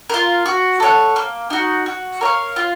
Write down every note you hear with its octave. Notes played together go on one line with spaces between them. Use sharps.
F4 A#4
F#4
A4 C#5 F#5
A#3
D#4 F#4
F#4
A#4 C#5 F5
F4